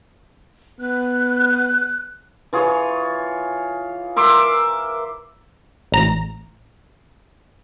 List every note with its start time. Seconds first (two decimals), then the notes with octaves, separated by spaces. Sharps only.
0.80 B3 F#6
2.53 E3 F4 G#4 C#5
4.16 A#4 E5 C6 D6
5.92 A1 A#5